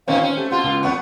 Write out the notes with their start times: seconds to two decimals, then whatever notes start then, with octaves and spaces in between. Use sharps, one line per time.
0.08 A#2 D#3 C4 C#4 F5
0.22 C#4
0.37 A3 G4
0.51 B2 F4 C6
0.64 C#2
0.83 F2 G#2 B3 F#5 C#6